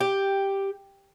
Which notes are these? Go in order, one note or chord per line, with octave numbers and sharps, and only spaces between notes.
G4